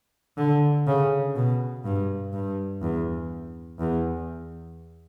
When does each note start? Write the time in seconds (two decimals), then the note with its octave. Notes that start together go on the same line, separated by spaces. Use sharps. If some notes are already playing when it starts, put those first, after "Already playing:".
0.37 D3
0.87 C#3
1.35 B2
1.84 G2
2.33 G2
2.82 E2
3.79 E2